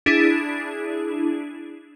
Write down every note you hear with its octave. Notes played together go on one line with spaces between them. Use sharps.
D4 E4 G#4